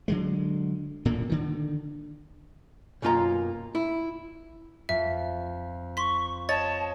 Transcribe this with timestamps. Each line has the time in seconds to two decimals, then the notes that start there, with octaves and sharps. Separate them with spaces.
0.08 D3 F#3 G#3
1.05 D1 A#2 D3 A#3
1.29 D3 D#3
3.02 B1 F#2 A#3 F4 D#5 A#5
3.75 E4
4.89 F2 E5
5.97 C6 C#6 B6
6.49 C#5 D#5 A5 A6